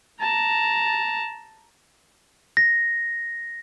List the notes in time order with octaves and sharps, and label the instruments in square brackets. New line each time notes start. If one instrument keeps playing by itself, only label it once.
[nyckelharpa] A5 A#5
[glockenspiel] A#6